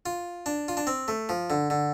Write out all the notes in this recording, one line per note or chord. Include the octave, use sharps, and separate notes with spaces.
F4
D4
F4
D4
C4
A3
F3
D3
D3